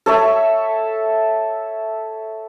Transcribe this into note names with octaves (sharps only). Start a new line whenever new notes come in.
A4 C#5 E5